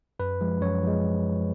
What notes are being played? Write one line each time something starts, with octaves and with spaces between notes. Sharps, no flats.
F#2 B4
F3 G#3
F#2 C#5
F3 G#3